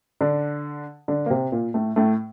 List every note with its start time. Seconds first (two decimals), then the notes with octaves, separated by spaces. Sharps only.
0.21 D3 D4
1.08 D3 D4
1.26 A#3
1.30 C3 C4
1.52 A#2 A#3
1.74 A2 A3
1.96 A2 A3